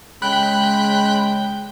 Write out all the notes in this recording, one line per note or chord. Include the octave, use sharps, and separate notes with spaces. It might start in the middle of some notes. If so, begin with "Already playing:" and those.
C#3 G#3 G5 B5 F#6